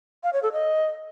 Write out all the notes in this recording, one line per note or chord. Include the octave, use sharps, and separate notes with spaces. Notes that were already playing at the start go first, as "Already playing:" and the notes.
F5
C#5
A4
D#5